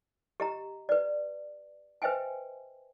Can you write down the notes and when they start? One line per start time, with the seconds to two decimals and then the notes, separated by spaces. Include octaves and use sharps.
0.40 G4 D#5 A#5
0.89 B4 D5
2.02 B4 C5 D#5 E5 G5 G#5